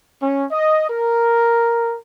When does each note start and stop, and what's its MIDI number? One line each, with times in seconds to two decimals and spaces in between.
0.22 0.44 61
0.52 0.86 75
0.90 1.96 70